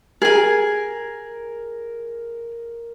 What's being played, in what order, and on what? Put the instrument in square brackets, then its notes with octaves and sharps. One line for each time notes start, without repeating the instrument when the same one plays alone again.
[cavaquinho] G#4 G#5 [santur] A#4